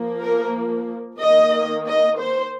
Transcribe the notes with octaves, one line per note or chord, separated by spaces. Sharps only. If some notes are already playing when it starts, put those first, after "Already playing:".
Already playing: F3 A#3
A#4
D#3 A#3 D#5
D#5
C5